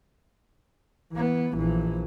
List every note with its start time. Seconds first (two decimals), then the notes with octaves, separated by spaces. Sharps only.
1.12 E3 B3
1.55 A#1 E3